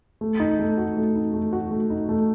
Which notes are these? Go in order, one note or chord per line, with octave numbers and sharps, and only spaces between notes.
A3
D#4
A3
F#4
A3
D#4
A3
F#4
A3
D#4
A3